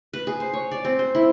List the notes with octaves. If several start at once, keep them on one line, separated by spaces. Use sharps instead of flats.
B4
G#4
C5
C#5
D5
C4
C5
E4